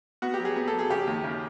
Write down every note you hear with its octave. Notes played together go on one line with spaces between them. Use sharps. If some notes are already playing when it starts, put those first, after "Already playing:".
B3 F#4
G4
F#3
G#4
B3
A4
F#3
G#4
C#3 G4
D#2
C#3